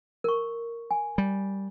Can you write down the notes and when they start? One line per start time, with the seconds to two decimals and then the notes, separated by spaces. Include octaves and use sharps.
0.24 A#4 C#6
0.91 G#5
1.18 G3